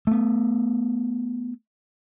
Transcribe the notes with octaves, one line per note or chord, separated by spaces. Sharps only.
A3 B3